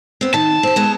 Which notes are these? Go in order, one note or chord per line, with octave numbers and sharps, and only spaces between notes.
B3 C4
D#3 A5
C4 G4
G#3 A3 B3